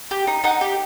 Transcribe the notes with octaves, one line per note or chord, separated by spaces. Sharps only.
G4
D#4
D#4 F#5
G4